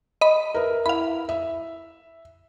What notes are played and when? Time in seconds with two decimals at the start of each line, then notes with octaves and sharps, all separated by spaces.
0.21 D#5 B5
0.54 A#4 B4 E5
0.86 E4 F5 B5
1.29 E5